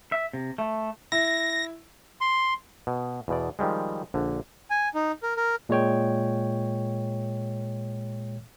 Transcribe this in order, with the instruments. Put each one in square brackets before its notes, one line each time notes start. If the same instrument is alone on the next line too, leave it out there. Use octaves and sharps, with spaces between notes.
[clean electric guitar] E5
C3
A3
[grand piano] E4 [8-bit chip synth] A#6
[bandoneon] C6
[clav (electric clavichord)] B2
E2 B2 D5
D#3 F3 G3 G#3
A#1 D3
[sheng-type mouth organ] G#5
D#4
A#4
A#4
[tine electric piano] A#2 G#3 C#5 G5